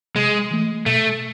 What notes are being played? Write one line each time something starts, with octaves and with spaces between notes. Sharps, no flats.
C3 G#3
E3 A3
B2 A3